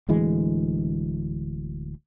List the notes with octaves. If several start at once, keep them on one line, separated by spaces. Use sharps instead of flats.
D1 D2 E3 G#3